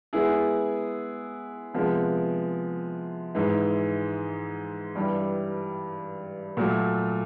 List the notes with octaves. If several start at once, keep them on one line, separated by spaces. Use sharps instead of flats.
G#3 B3 E4 G#4
C3 F3 G#3 B3
G#2 E3 G#3
G2 E3 G3
A#2 F#3 A3